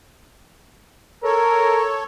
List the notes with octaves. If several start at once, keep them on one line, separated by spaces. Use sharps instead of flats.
A4 A#4 C#5